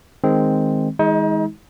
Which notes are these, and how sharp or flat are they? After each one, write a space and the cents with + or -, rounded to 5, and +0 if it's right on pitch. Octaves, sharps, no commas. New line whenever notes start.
D#3 +0 G#3 +0 C4 +0
E3 -45 G#3 +0 D#4 +35